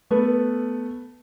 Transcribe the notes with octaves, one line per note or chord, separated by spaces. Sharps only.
A3 B3 A4 B4